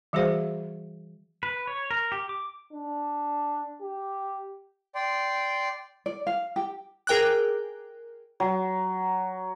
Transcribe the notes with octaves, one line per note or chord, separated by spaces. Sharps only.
E3 G3 F#4 G#4 C5 F5
B4
C#5
A#4
G4
D6
D4
G4
D5 G5 C6
D5
F5
G4
G#4 A#4 G5 D6 F#6
F#3